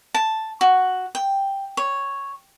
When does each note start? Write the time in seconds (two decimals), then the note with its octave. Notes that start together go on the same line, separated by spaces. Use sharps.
0.14 A5
0.61 F#4
1.15 G5
1.77 C#5